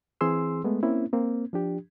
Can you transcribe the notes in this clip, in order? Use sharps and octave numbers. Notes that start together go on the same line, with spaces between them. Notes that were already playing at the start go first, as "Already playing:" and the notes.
E3 C4 G#4 C6 E6
G#3 A3 B3
A#3 C4 C#4 E4
A#3 C4
F3 D4 G4